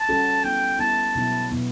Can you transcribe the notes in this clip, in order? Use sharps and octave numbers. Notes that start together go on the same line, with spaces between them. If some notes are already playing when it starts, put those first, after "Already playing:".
Already playing: A5
G3 C#4 F#4 A4
G3 B3 E4 G5
G3 B3 E4 A5
B2 F#3 B3 E4
B2 F#3 B3 E4